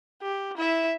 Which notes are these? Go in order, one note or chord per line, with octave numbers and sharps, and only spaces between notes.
G4
E4 E5